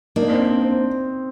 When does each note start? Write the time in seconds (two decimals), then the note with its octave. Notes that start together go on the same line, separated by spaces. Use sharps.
0.16 A#3 D4 D#4
0.32 C4
0.47 C4
0.62 C4